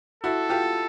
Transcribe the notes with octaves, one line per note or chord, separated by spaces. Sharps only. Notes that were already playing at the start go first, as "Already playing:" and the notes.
E4 F#4 A4
F4 G4